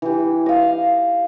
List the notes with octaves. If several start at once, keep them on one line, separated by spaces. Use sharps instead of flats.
E3 G4
D#5 F5